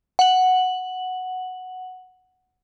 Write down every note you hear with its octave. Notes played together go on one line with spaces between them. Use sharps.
F#5 F#7